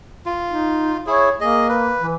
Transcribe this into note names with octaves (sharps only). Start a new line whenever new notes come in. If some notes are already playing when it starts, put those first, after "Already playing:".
F4
D#4
E4 G#4 C#5
A#3 G#4 D#5
B4
E3